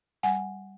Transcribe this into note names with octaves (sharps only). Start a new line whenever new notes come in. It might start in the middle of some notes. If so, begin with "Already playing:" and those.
G3 F#5 G#5